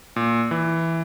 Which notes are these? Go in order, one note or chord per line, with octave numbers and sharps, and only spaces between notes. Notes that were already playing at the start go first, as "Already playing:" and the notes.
A#2
E3